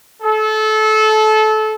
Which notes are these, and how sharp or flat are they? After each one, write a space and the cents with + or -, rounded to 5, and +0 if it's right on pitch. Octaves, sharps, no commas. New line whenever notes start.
A4 -25